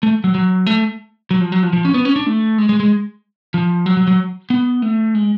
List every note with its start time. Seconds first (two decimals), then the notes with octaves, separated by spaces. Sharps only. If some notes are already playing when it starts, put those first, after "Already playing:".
0.03 A3
0.24 F#3
0.35 F#3
0.66 A3
1.31 F#3
1.41 F3
1.52 F#3
1.63 F3
1.73 F3
1.85 C#4
1.94 B3
2.05 C#4
2.16 D4
2.26 A3
2.58 G#3
2.69 G#3
2.80 G#3
3.54 F3
3.86 F#3
3.97 F#3
4.08 F#3
4.50 B3
4.82 A3
5.15 G#3